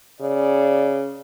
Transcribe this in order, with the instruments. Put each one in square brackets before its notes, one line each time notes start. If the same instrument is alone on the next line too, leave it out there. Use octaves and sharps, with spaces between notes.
[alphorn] C#3 [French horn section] D5